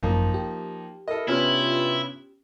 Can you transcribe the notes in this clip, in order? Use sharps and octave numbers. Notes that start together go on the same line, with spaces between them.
G#1 F#2 F3 A#3 D#4
G4
E4 A4 A#4 D#5
G2 C3 B3 C#4 E4 F4 F6